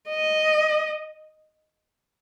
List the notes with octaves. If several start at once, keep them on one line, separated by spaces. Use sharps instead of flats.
D#5